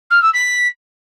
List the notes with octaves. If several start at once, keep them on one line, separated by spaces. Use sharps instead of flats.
F6
E6
B6